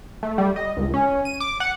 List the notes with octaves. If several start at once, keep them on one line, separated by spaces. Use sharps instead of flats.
A3
G3
D#5
C#2
C#4
D#7
D6
F#5